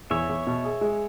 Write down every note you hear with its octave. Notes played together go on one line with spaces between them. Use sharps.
E2 C#5 E5
E2
B2
G#4
G#3